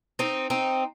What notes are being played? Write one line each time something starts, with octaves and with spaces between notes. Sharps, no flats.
C4 D#4
C4 D#4